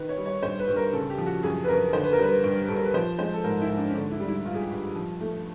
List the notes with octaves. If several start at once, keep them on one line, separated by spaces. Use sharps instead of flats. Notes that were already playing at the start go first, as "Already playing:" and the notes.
Already playing: D#3 B4
C#5
G3
C#5
G2 C5
B4
G2
A#4
C#3 A4
G4
F3
F#4
F#2 G#4
B4
F#2 A#4
D3 C5
B4
A#4
G3 B4
G2
G2 A4
A#4
B4
F3 C5
G#3 C5
A4
G#2 A#4
E4
G#2
D4
C#4
D3 D4
E4
G3
E4
G2 F4
G#4
G4
G2
F3
A3